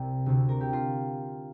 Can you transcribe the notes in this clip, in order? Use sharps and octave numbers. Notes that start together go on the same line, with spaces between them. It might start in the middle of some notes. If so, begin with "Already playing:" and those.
Already playing: C2 C3 A#4
D2 C3
A#4
G4
F4